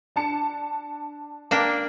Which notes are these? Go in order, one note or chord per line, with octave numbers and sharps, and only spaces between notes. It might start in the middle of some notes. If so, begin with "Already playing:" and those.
D4 A5 C#7
A#3 D4 F5 G5